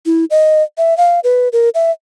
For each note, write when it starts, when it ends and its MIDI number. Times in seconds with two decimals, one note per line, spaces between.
0.06 0.25 64
0.30 0.63 75
0.78 0.97 76
0.98 1.20 77
1.24 1.49 71
1.53 1.69 70
1.75 1.91 76